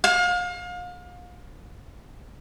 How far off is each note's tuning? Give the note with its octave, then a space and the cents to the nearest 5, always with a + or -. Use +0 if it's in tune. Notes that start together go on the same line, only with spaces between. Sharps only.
F5 +35